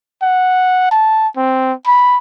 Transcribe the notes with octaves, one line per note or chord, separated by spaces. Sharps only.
F#5
A5
C4
B5